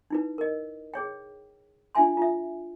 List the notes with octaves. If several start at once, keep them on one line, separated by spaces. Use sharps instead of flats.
D#4 E4 B4
A#4 D#5
G#4 C#5 G5
D4 F4 E5 G#5 C6
F4 E5